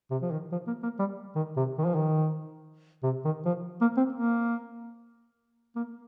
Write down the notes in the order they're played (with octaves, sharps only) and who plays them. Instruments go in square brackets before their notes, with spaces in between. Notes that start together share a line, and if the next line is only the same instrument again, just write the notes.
[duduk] C3
F3
D#3
F3
A#3
A#3
G3
D#3
C3
D#3
F3
D#3
C3
D#3
F3
A#3
C4
A#3
A#3